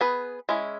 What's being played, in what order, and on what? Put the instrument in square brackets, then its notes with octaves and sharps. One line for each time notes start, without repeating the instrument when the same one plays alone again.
[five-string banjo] B3 G#4 B4
G#3 C#4 E4